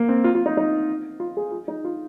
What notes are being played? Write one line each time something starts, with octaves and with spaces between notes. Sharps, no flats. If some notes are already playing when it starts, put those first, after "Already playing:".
Already playing: A#3
C4
F4
F4
D#4
D#4
F4
G#4
F4
D#4
F4